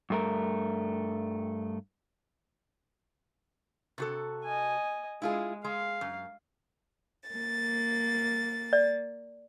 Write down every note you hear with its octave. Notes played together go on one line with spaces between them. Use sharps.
G2 A3 A#4
C3 F#4 A4
D#5 G#5
G#3 E4 F4 G#4
G#3 F5
F#2
A#3 A6
D5